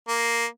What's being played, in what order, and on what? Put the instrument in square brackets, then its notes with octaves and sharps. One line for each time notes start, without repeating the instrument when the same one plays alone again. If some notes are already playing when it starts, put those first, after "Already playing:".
[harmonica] A#3